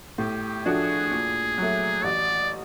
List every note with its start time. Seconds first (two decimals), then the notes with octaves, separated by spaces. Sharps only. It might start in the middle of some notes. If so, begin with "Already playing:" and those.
0.18 A2 G4
0.65 F3 A3 D4 F#4 G#4
1.11 A#2
1.57 F#3 A3
2.04 A1 D5